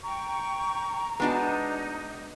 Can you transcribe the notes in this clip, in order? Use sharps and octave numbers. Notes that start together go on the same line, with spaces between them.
G5 A#5 C#6
G#3 B3 D4 D#4 F#4 A5